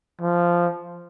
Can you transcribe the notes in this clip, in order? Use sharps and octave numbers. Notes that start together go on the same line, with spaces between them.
F3